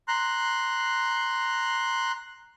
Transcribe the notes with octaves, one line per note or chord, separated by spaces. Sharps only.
A#5 C6 F#6